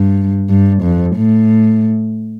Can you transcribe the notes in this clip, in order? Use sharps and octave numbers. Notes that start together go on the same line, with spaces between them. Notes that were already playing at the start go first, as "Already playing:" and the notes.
Already playing: G2
G2
F2
A2